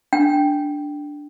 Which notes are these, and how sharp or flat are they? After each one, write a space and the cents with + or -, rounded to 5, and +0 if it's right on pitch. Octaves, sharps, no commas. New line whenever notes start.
D4 +0 G5 +0